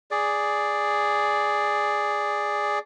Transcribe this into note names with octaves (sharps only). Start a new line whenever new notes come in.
G#4 D5